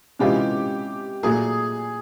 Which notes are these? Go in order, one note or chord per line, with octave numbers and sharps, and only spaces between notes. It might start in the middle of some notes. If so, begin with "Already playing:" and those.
C3 E3 G#3 C#4 F4 G4
A#2 F#3 A3 G#4